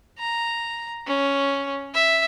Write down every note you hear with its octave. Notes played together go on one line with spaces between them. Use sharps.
A#5
C#4
E5